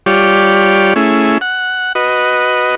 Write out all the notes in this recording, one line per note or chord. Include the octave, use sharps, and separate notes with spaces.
G3 F4 G4 C#5 D5
A3 C#4 E4 G#4
F#5
F#4 B4 D#5